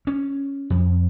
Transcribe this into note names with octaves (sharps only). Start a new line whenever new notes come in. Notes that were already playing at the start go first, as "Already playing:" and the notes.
C#4
F2